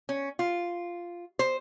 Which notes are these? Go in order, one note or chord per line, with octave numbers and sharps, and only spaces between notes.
C#4
F4
C5